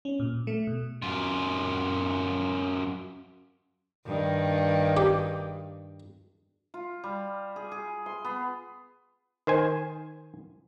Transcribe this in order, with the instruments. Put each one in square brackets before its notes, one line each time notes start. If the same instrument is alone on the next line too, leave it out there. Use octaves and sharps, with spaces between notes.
[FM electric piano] C#4
A#2
A3
B2
[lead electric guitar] F#2 F4
[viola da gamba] G2 D#3
[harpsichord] G4
[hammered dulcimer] F4
G3
G#4
G#4
C6
B3
[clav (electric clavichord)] D#3 C5 G#5